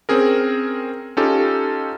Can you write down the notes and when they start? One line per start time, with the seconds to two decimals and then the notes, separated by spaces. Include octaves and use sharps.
0.09 C4 C#4 G#4 A#4
1.17 C#4 D#4 F4 G4 A4